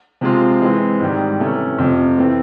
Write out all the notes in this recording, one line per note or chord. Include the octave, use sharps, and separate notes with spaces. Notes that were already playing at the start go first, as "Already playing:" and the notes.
C3 F3 G#3 C4 F4
E3 G#3 C4
G#2 D#3 G3
C3 E3 A3 C#4
F2 C3 F3
E3 A3 C4